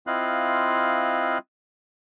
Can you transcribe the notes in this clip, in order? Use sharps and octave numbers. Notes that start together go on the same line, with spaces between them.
C4 E4 F4 D#5 F5 F#6